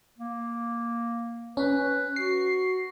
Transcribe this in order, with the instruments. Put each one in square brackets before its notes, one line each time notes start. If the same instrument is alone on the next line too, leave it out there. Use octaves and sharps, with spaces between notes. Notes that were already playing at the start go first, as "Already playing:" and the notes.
[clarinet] A#3
[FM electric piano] C#4 [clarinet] B4
[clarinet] F#4 [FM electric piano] C7